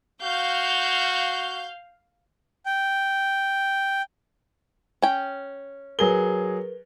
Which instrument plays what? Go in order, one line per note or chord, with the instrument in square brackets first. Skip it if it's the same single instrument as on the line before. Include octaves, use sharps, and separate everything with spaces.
[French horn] F#4 [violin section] F5 G6
[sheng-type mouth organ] G5
[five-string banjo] C#4 G5
[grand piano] F#3 G#4 G7 [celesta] A#4 B4